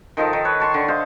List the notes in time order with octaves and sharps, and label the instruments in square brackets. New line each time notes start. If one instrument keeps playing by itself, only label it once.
[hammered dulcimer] D#3 F3 D#4 A4
D#3
B4 C#5
C#5 A5 C6 C#6
D3
C5 D#5 F5